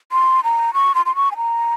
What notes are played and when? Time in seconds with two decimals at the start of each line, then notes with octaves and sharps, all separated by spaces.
0.12 C6
0.44 A#5
0.74 C#6
0.95 C6
1.06 C6
1.16 C#6
1.32 G#5
1.37 A#5